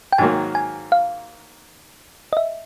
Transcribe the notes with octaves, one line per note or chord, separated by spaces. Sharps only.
G5
G#2 D#3 F#3 A#3 G#5
G#5
F5
D#5
E5